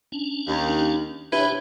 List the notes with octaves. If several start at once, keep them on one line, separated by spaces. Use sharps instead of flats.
C#4 D4
D#2
C3 D4 E4 G4 B4 C#5